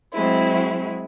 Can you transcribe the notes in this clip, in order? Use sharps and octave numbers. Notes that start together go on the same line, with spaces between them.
F#3 G#3 C4 E4